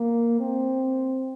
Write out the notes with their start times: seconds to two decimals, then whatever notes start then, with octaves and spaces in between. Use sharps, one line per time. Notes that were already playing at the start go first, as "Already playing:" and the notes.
Already playing: A#3
0.40 C4